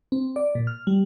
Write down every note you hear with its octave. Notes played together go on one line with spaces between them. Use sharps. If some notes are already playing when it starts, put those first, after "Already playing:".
C4
D5
A#2
F6
G3